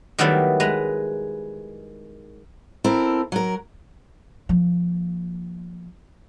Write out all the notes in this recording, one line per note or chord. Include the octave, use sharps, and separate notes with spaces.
D#3 F#3 G3 A3 B3 E4
G#3 B4 A#5
C4 E4 A4 A#4
F#3 A#4
F3 A#3